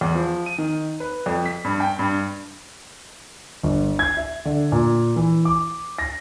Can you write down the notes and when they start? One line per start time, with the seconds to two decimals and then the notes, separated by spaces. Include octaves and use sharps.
0.01 E2
0.15 F3
0.46 D#7
0.58 D#3
1.00 B4
1.26 F2
1.46 B6
1.64 G2
1.80 G5
1.99 G2
3.63 G1
3.99 G#6
4.17 E5
4.45 D3
4.72 A#2
5.16 E3
5.45 D6
5.98 A#6